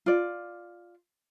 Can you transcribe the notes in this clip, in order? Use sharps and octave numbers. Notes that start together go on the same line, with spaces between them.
F4 D5